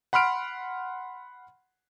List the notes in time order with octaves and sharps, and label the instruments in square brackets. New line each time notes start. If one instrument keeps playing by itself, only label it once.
[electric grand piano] F#5 B5 C6 F6 D7